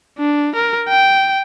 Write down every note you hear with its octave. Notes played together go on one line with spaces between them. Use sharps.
D4
A#4
G5